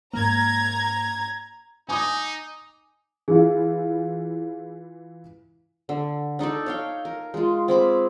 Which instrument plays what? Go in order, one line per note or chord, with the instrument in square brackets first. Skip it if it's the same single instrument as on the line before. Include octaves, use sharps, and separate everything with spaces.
[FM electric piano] G#2 A#3 [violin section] A#5 G#6
[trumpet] D#4 [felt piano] G#5 D6 D#6
[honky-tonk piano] E3 E4 F4 [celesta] G#4
[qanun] D3
D4 D#4 A4 D5
C#5 F5 G5
A#4
G#3 F4
C4 G#4 B5 D6